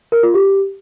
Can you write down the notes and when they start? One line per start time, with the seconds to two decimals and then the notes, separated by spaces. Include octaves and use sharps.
0.12 A#4
0.23 F4
0.34 G4